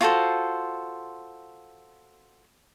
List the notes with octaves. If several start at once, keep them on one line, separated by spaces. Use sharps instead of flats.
F4 F#4 A4 C5